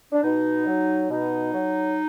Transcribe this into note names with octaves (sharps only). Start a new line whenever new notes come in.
D4
B2 D#4
F#3
B2 D#4
F#3